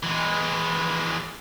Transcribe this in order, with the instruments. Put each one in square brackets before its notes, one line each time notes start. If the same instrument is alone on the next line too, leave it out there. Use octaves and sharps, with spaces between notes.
[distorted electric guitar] E3 G#3